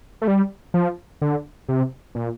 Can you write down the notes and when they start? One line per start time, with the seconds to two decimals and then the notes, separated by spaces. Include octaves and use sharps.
0.22 A3
0.28 G3
0.74 F3
1.21 D3
1.68 C3
2.15 A#2